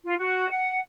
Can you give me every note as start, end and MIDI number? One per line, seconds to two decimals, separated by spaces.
0.05 0.14 65
0.18 0.48 66
0.50 0.78 78